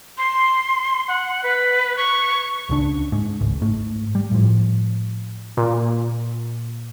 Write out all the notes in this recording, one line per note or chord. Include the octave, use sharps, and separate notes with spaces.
C6
F#5
B4
C#6
C#2 C#3 D4
G#2
G#1 C#2
G#2 A3
G3
A2 F3
A#2